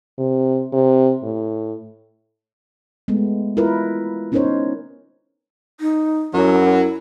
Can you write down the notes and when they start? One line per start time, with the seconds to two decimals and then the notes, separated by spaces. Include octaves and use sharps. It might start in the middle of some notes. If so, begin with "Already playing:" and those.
0.18 C3
0.73 C3
1.23 A2
3.08 G#3 A3 B3
3.57 E4 F4 A#4 B4
4.32 B3 C#4 D#4 A#4 C5 C#5
5.80 D#4
6.34 F#2 F#3 E4